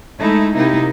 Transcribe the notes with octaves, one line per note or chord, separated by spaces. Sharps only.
G#3 A3 D#4 E4
C3 A#3 D#4 E4